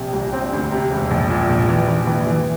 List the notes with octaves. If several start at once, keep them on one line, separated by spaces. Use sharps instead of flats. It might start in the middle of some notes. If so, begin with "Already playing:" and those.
Already playing: A#1 C3
C2
C4
D2
C3
E1
A#1
A#2
A#1
E3
E3
E3
E3